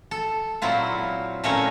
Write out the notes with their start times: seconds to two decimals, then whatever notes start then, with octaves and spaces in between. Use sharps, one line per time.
0.11 A4
0.62 A#2 F#3 C4 E4 F4
1.44 A#2 A3 C4 C#4 A#4 C#5